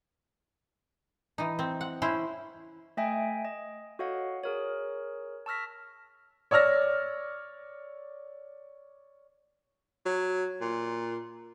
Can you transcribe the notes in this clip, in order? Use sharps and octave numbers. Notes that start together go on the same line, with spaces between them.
E3 D#4
C4
F#5
C#4 E4 C5
A3 D#5 E5 G5 G#5
D#5
F#4 A4 C#5 D#5 F5 F#5
G#4 A#4 C#5
A5 C#6 E6 F6 A#6 B6
C#5 D5 E6 F6 A#6
F#3
A#2